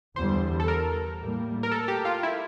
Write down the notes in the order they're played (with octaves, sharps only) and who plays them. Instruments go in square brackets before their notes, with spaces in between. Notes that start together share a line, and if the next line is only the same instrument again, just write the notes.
[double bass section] E2 D3 G3 [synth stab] C5
[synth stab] A4
A#4
[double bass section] A2 G3 A#3
[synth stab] A#4
A4
G4
F4
E4